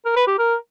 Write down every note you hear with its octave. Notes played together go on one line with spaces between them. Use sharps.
A#4
B4
G4
A#4